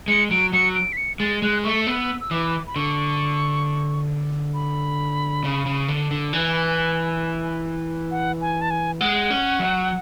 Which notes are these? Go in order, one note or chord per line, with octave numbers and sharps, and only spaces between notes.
G#3 C#7
F#3 D7
F#3 C#7
D7
B6
C#7
G#3 A6
G#3 F#6
A3 C#6
B3 E6
E6
E3 D6
B5
D3 C#6
B5
C#3
C#3
D3
D3
E3 G#5
F#5
G#5
A5
G#5
G#3 F#5
C#4
F#3